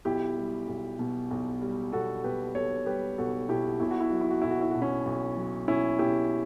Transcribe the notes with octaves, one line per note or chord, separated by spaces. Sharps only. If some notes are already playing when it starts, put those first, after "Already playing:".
B1 E4 G4
G3
B1
B2
B1
G3
B1 F#4 A4
B2 G4 B4
B1 A4 C#5
G3 G4 B4
B1 F#4 A4
B2 E4 G4
B1 E4
F#4
E4
F#3 F#4
E4
F#4
B1 E4
F#4
E4
B2 F#4
C#4 E4
B1
F#3
B1 C#4 E4
B2 E4 G4